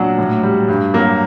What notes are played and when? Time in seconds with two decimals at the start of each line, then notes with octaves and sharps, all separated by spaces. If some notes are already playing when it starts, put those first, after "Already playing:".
Already playing: A#2 F#3 D4 F#4
0.18 A2
0.43 G3
0.68 G2
0.94 F#3 A#3